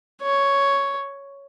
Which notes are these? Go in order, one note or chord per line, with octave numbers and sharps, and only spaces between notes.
C#5